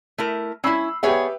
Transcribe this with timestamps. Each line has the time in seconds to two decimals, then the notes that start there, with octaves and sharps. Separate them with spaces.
0.18 A3 E4 A#4
0.64 C#4 E4 B5 E6 C7
1.03 B3 G4 G#4 B4 C#5 E5